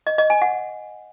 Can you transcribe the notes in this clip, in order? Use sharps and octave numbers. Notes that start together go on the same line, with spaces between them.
D#5
D#5
G#5
F#5